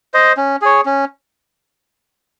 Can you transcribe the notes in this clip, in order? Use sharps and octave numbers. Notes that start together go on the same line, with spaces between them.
C5 D#5
C#4
G#4 C#5
C#4